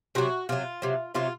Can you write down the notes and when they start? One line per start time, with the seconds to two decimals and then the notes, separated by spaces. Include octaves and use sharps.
0.15 C3 F#3 F#4
0.49 C3 F#3 F4
0.82 C3 F#3
1.15 C3 F#3 F4